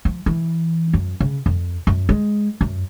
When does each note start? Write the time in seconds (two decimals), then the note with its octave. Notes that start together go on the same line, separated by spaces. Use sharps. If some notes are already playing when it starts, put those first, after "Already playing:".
0.05 F3
0.26 E3
0.93 F#2
1.20 C#3
1.46 F2
1.87 F#2
2.09 G#3
2.61 F#2